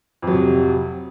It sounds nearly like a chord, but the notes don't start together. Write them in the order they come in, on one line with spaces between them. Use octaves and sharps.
F2 F#3 C3